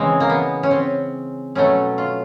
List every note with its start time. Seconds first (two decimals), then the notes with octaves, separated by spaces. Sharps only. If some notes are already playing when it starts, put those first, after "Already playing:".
Already playing: C#3 E3 G#3 C4
0.20 A#3
0.30 B3
0.63 C#4
0.71 C4
1.55 B2 F#3 A3 C#4
1.98 F4